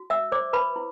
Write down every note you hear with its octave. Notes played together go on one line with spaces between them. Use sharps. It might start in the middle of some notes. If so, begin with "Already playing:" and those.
Already playing: F#4
E5 E6
C5 D5 D6
B4 B5
E4